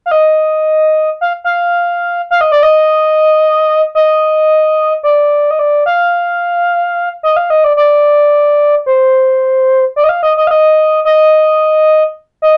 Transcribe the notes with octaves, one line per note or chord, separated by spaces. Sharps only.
F5
D#5
F5
F5
F5
D#5
D5
D#5
D#5
D5
D#5
D5
F5
D#5
F5
D#5
D5
D5
C5
D5
D#5
F5
D#5
D#5
F5
D#5
D#5
D#5